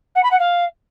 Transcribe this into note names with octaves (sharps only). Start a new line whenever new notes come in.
F#5
B5
F#5
F5